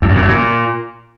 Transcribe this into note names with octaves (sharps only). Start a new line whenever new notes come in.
E2
F#2
A#2
F#2
A#2